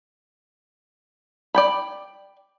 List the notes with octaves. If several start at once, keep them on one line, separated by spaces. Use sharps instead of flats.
D5 G5 B5